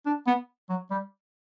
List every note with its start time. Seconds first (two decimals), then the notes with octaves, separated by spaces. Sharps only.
0.06 D4
0.27 B3
0.69 F#3
0.91 G3